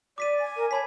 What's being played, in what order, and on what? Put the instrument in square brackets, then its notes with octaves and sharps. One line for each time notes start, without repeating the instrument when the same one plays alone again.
[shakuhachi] D5 [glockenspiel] D6 B6 D#7
[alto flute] G#5
[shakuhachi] A#4
[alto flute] C#5 [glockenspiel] G#5 B5 B6 [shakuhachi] A5